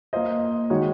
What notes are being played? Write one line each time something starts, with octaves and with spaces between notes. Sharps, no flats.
A#3 F4 C5 D#5
D#3 G#3 D#4 F#4 C#5